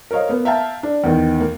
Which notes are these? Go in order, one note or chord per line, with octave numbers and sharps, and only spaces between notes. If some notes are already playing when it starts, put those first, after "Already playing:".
A#4 C5 C#5 D#5 F5
A#3 B3
E5 F5 G5 A5 A#5
D4
E2 D#3
A#3